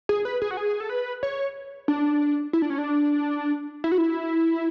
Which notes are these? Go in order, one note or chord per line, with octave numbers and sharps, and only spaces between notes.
G#4
B4
G#4
F#4
G#4
A4
B4
C#5
D4
E4
D4
C#4
D4
E4
F#4
E4